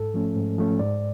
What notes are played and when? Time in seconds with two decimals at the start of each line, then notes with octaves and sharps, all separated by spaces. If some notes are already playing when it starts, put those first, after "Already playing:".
Already playing: G#2 A4
0.14 F3 A3 C#4
0.36 G#2
0.59 F3 A3 C#4
0.79 G#2 D5